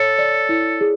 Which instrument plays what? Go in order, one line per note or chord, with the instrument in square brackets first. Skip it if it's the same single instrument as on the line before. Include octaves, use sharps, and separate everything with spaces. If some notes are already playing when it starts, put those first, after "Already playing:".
Already playing: [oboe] A4 [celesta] C#5
[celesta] D5
E4
G#4